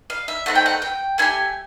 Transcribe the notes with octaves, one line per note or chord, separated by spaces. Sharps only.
F5
E5
A3 C4 D#4 F#5
G5
F#5
G5
A3 D4 G4 G#5